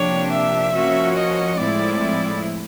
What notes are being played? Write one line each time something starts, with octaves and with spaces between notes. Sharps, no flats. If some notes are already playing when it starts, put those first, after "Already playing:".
Already playing: C3 F3 A#3 D4 G4 C#5
E5
F3 A#3 C#4 F#4
D#5
A2 F3 G#3 C4 E4 D5